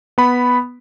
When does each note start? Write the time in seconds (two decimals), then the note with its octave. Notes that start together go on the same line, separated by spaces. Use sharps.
0.18 B3 B5